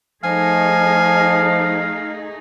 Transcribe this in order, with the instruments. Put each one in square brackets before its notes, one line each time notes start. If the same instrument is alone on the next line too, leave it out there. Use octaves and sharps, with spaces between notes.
[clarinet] F3 [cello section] A3 D#4 G#4 [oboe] F5 [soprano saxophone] G#5